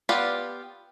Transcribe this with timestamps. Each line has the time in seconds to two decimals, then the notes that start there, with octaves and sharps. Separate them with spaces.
0.09 B3 F4 G4 B4 D5